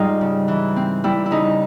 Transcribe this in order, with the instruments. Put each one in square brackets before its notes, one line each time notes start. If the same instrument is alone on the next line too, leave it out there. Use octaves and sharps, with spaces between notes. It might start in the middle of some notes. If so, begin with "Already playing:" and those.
Already playing: [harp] G#2 G3 D#4 F4
C#3
E3
C4
G3 E4
E4
C#3 D#4